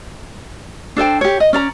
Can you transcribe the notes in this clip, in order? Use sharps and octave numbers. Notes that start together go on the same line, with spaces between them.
D4 A4 C5 G5
G4 C#5
D#5
C#4 D5 A#5